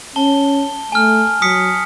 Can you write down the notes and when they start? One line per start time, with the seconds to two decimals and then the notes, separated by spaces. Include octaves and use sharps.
0.16 C#4 A5 G7
0.92 A3 G#5 F6
1.42 F#3 D#6 B6 C#7